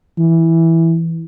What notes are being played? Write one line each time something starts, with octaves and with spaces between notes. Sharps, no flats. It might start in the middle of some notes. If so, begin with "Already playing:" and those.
E3